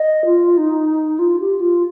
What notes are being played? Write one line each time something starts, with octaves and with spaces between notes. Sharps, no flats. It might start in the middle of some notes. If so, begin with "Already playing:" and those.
Already playing: D#5
F4
D#4
F4
G4
F4